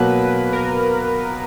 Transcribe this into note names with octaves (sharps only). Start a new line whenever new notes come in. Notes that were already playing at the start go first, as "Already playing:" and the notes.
Already playing: B2 F#3 A#3 B4
A#4